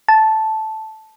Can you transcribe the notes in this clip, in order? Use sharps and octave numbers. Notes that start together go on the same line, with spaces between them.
A5